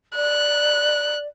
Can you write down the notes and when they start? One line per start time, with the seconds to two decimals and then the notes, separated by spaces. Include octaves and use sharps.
0.16 D5 F#6